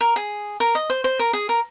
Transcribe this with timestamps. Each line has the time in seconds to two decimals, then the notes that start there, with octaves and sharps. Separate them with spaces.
0.01 A#4
0.16 G#4
0.60 A#4
0.75 D#5
0.90 C5
1.04 C5
1.19 A#4
1.33 G#4
1.49 A#4